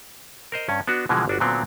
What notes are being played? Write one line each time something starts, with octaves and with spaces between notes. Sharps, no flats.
A#4 C5 D#5
G2 C#4
B3 D4 F#4
B2 D3 E3 F3 G3 G#3
G1 D4 F#4
A#2 D3 F#3 B3 C4